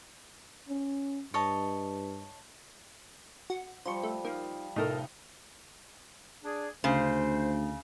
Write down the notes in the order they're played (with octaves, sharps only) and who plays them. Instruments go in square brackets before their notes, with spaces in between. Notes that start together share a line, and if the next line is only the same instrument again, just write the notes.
[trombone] C#4
[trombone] G2 [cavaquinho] C#5 D#5 A5
[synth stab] F#4
[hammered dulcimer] F3 G3 [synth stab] C5 C#6
[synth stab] A3
[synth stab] A#3 [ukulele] D#4 F4
[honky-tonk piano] F1 D#4 [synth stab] A2 [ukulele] F4 A4 A#4
[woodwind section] D4 G#4 D5
[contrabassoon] D2 [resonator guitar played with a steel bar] C#3 [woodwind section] C5